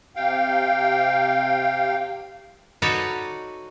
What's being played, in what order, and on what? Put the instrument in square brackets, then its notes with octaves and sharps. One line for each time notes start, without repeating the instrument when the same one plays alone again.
[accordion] C3 F5 G5
[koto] D#4 F#4 A4 B4 C#5 D5